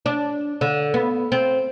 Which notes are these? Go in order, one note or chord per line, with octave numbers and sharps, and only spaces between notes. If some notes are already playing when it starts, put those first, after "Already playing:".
D4
D3
B3
C4